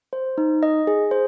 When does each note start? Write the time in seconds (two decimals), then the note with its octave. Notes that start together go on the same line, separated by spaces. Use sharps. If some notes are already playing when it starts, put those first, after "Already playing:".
0.13 C5
0.38 D#4
0.63 D#5
0.87 G#4
1.11 C5